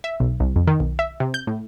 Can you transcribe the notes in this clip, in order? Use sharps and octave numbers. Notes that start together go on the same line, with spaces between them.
E5
B1
C2
F2
D#3
B1
E5
C3
G6
A2